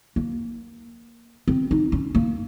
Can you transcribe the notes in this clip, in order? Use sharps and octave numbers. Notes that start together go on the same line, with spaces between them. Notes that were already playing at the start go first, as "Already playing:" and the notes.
A#3
C4
D#4
C#4
A#3